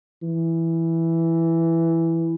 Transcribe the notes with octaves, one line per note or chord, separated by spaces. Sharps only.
E3